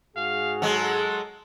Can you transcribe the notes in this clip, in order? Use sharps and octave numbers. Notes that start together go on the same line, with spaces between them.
G#2 F#4 G#4 F5
F#3 G#3 A4